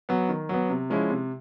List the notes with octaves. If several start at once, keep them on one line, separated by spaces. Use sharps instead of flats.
F#3 B3
D#3
F#3 B3
C3
F3 G#3 C#4 E4
C3